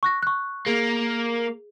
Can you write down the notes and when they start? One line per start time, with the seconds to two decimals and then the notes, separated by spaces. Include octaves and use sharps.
0.03 C#6 F#6 A#6
0.23 C#6 F#6
0.66 A#3 G#4